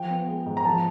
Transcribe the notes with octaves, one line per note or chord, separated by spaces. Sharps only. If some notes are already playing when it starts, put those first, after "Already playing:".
Already playing: F3 G5
B3
G#3
G#2
A#5
F3 A5